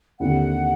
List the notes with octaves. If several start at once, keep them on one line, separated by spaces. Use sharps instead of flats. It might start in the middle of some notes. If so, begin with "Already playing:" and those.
D#2 D3 G3 C4 E4 F#5